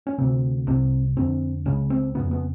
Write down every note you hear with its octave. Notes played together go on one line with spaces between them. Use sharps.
C#4
D2 C3 C4
C2 C3 C4
F2 D3 C4
C#2 C#3 C#4
C4
F2 C#3 B3
B3